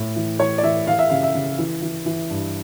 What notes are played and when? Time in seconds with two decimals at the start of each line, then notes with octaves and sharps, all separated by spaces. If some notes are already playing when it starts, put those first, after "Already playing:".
Already playing: A2
0.16 E3
0.39 E3 C#5
0.58 D5
0.63 E3 E5
0.87 E3 F5
0.99 E5
1.10 C#3 F5
1.23 E5
1.35 C#3
1.59 E3
1.82 E3
2.06 E3
2.30 G2